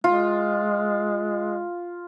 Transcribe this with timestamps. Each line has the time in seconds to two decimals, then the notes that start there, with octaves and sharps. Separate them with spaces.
0.04 G#3 F4